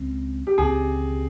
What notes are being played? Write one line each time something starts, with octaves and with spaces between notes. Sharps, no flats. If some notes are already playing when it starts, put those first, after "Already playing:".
Already playing: C#2 C#3 G#3 C4
G4
C#2 C#3 G#3 C4 G#4